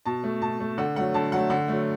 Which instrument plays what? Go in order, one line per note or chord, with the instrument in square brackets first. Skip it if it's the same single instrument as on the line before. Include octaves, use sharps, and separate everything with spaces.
[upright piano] B2 A5
A3
B2 A5
A3
D3 F#5
F#3 A3 F#5
D3 A5
F#3 A3 F#5
D3 F#5
F#3 A3